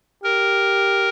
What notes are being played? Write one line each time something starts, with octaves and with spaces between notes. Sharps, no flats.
G4 A#4